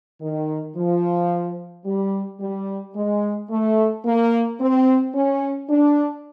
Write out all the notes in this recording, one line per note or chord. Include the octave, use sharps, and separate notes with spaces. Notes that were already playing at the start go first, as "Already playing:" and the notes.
D#3
F3
G3
G3
G#3
A3
A#3
C4
C#4
D4